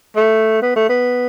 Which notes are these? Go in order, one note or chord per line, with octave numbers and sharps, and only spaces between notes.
A3
B3
A3
B3